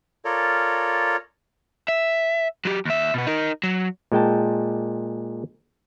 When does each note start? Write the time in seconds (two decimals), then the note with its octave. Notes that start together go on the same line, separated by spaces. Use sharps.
0.25 F4 A4 A#4 C#5 D5
1.88 E5
2.65 F#3 G4
2.85 D#2 E5
3.14 B2 B3
3.27 D#4 A#4
3.63 F#3
4.12 A#2 G#3 G5 A5